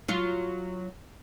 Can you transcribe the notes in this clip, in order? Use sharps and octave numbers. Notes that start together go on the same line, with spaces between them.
F#3 F4